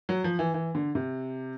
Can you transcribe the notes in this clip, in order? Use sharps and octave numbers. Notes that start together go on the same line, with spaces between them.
F#3
F3
E3
E3
D3
C3